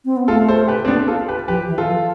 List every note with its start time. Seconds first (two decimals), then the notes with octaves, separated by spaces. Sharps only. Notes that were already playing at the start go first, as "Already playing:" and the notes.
0.05 C4
0.16 B3
0.28 A3 F4 A4
0.48 A4 C5
0.68 G4 B4
0.85 C4
0.87 B3 D4
1.08 F4 A4
1.28 G4 B4
1.48 F3 G4 B4
1.68 E3
1.78 F4 A4
1.88 F3